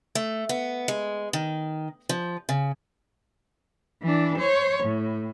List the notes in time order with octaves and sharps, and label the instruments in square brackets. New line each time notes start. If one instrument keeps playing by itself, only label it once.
[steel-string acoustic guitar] A3
B3
G#3
D#3
F3
C#3
[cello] E3 D4
C5 C#5
A2